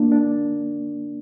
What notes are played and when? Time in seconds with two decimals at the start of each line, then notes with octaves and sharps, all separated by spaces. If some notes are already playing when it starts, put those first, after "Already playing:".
Already playing: A#3 D4
0.12 D4